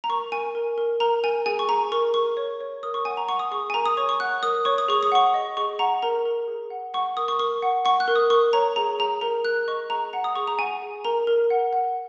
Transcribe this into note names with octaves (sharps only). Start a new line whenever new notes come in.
A#5
A#4 C#6
A#4 G#5
A#4
A#4
A#4 A#5
A#4 G#5
G#4 G#5
C#6
G#4 A#5
A#4 C#6
A#4 C#6
C#5
C#5
A#4 D#6
C#6
F#5 G#5
A#5
F#5 C#6
D#6
G#4 C#6
G#5
A#4 A#5
D#6
C#5 C#6
C#6
F#5 F#6
A#4 D#6
C#5 C#6
D#6
G#4 C#6
D#6
F#5 C#6
D#5
G#4 C#6
F#5 A#5
A#4 A#5
A#4
G#4
F#5
F#5 C#6
A#4 D#6
C#6
A#4 C#6
F#5
F#5 C#6
F#6
A#4
D#6
A#4 C#6
C#5 A#5
G#4 A#5
G#4 A#5
A#4 A#5
A#4 F#6
D#5 C#6
G#4 A#5
F#5 A#5
D#6
G#4 C#6
A#5
F#5 G#5
G#4
A#4 A#5
A#4
F#5
F#5